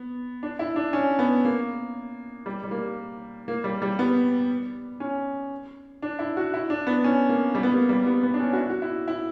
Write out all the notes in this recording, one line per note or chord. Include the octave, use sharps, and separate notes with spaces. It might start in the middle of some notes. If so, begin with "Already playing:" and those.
Already playing: B3
D4
E4
D4
C#4
B3
A#3
G3
G3
A#3
A#3
G3
G3
B3
C#4
D4
E4
F#4
E4
D4
B3
C#4
A#3
G3
B3
A#3
G3
B3
B3
D4
C#4
F#4
E4
F#4
E4
E4